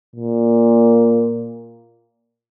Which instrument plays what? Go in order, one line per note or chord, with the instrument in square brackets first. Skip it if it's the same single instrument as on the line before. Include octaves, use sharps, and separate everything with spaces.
[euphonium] A#2